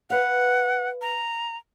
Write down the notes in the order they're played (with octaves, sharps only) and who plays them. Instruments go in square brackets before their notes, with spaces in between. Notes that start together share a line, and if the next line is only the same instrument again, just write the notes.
[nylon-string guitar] B4 F5 [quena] F#5
[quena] A#5